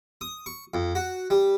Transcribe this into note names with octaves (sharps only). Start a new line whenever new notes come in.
D#6
C#6
F2
F#4
G3